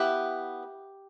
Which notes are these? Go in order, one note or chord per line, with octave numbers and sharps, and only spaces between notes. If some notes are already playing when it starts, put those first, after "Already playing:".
Already playing: B3 E4 G4 B4